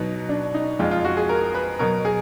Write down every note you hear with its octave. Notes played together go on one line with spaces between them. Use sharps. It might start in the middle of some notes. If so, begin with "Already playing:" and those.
Already playing: B2 F#3 D#4
D4
D#4
F2 F3 G#3 F4
F4
F#4
G#4
A#4
B4
B2 F#3 A#4
G#4